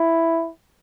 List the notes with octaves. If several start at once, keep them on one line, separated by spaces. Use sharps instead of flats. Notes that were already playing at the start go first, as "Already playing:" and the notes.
Already playing: E4